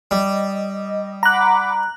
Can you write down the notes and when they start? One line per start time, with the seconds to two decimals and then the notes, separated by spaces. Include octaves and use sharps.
0.11 G3 D#5
1.23 F#5 A#5 B5 D6 F#6